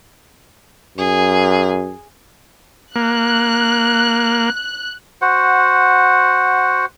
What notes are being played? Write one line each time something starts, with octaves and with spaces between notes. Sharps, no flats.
F#2 G#4
A#3 F#6
F#4 C5 F#5